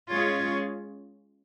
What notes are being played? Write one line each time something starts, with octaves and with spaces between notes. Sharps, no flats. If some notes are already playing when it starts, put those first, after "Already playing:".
G#3 C#4 F4 G#4 C#5